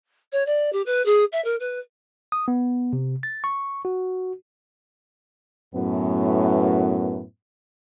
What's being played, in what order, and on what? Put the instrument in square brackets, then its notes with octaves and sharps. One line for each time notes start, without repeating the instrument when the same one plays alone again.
[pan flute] C#5
D5
G4
B4
G#4
E5
A#4
B4
[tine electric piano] D#6
B3
C3
A6
C#6
F#4
[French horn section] F#2 A2 B3